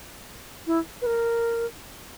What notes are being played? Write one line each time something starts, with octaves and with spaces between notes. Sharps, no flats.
E4
B4
A#4